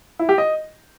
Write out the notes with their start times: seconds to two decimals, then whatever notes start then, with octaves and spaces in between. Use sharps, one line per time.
0.19 E4
0.29 G4
0.38 D#5